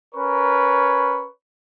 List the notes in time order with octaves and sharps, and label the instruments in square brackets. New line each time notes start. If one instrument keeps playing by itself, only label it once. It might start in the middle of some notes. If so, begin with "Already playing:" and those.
[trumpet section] C#4 A#4 B4 C#5 C#6